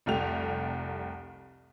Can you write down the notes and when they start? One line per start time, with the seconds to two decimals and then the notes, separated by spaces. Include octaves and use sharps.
0.06 F1 C2 A3 G4 F7